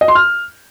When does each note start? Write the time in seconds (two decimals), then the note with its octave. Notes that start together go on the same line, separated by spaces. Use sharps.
0.01 D#5
0.08 C6
0.15 F6